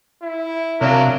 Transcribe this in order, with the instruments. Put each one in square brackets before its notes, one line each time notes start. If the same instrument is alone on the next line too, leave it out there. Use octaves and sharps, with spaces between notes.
[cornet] E4
[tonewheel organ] C3 [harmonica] F#3 D4 A#4 [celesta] C#5 E5 F5